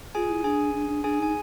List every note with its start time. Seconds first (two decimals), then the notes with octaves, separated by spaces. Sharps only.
0.15 F4 G#4 G#5
0.30 E4
0.44 D4 G#4 G#5
0.74 D4
0.89 D4
1.04 D4 G#4 G#5
1.19 D#4 G#5